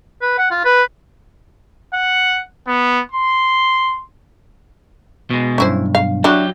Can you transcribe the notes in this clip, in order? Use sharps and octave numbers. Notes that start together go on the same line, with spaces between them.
B4
F#5
F4
B4
F#5
B3
C6
B2 G#3
B1 G2 C#4 E4 C5
F5
F#3 D4 E4 F#4 G4